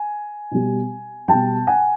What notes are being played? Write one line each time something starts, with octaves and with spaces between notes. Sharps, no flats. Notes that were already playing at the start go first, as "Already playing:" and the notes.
Already playing: G#5
B2 G3
B2 G3 G5 A5
F#5 G#5